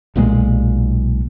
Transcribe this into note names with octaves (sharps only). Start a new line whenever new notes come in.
B1 A#2 D#3 G#3